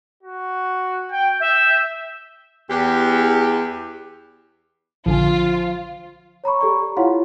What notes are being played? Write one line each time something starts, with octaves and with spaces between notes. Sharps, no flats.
F#4
G5
E5 G6
E2 G4
A#1 D3 F3 F4 G#5
C#5 A#5 B5 C#6
G4 A4 D5 C#6
A#5
E4 F4 C#5 F5 F#5 C6